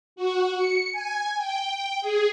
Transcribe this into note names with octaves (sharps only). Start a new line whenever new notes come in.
F#4
C#7
G#5
G5
G#4